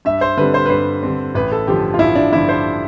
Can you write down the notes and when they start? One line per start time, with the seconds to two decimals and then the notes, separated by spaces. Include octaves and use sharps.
0.05 G2 E5
0.21 C5
0.37 D3 G3 C4 B4
0.54 C5
0.66 B4
0.70 G2 C5
1.03 D3 G3 C4
1.34 A1 B4
1.52 A4
1.67 G2 D3 F3 G4
1.94 F4
1.99 A1 E4
2.15 D4
2.32 G2 D3 F3 E4
2.49 C5